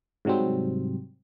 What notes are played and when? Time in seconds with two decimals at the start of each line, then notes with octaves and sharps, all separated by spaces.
0.25 G#2 C3 F#3 G3 C4